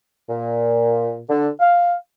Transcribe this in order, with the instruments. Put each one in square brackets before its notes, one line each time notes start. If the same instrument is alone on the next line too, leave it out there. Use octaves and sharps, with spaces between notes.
[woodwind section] A#2
D3
F5